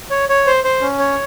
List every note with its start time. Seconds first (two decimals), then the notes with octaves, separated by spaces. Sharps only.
0.11 C#5
0.29 C#5
0.47 C5
0.64 C5
0.81 C#4
0.99 C#5